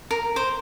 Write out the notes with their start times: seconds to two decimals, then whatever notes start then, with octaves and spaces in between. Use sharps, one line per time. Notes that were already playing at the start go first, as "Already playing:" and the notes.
0.11 A#4
0.36 C5